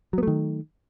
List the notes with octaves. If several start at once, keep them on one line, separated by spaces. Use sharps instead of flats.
D#3 F#3 A3 B3